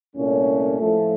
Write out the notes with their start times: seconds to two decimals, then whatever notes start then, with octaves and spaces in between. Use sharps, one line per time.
0.14 C2 A#2 A3 C#4
0.80 A2 F3 A3